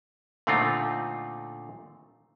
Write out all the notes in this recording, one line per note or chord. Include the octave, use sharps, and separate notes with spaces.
A#2 D3 A3 C4 D#4 F4